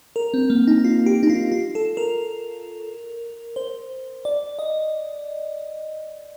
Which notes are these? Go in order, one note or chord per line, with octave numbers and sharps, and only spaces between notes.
A#4
C4
A#3
D#4
F4
G4
D#4
F4
F4
A4
A#4
C5
D5
D#5